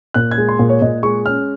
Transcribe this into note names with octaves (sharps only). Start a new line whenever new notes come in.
A#2 F#6
G#6
G#3
C6
A#2
C#5
A#2 D#5
G#3 C#6
C#4 F6